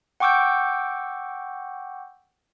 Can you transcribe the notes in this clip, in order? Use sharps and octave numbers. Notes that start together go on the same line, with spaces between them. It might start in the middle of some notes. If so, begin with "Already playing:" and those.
F#5 G5 C#6 D6 E6 G6